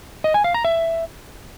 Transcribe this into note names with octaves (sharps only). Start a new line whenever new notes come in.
D#5
G#5
F5
A#5
E5